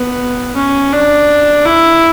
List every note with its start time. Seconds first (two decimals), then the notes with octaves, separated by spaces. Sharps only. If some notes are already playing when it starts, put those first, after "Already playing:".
Already playing: B3
0.56 C#4
0.92 D4
1.65 E4